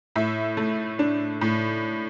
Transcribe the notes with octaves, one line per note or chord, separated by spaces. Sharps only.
A2 E5
A3
D4
A2